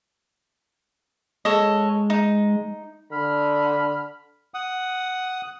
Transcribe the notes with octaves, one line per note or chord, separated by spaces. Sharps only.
G#3 A4 C#5 D#5
D#4
D3 B5 F6
F#5 D#6